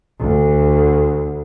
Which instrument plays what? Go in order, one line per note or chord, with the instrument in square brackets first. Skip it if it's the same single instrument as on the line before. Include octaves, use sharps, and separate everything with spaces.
[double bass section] D2